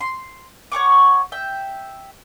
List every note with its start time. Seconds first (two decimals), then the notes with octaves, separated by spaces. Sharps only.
0.01 C6
0.72 C#5 F#5 C#6 D6
1.32 E5 G5